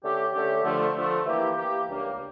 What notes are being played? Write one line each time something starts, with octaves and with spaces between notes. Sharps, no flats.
D3 A3 C#4 G4
D3 A3 C#4 G4
D3 F3 A3
D3 F3 A3
E3 A#3 E4 G4
E3 A#3 E4 G4
C#2 C#3 G3 A#3 D4